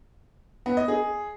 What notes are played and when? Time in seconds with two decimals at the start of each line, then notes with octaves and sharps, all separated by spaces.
0.66 B3
0.77 D#5
0.88 G#4